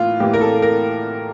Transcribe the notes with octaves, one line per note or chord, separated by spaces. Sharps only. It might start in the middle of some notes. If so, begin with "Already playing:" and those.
Already playing: A2 E3 A#3 F4
A2 E3 A#3 G4
A#4
A4
A#4